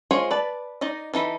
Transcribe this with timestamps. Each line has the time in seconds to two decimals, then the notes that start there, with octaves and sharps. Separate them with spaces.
0.11 G#3 F4 G#4 C5 C#5
0.31 B4 D5 A5
0.81 D#4 D5 D#5
1.14 E3 D#4 A4 B5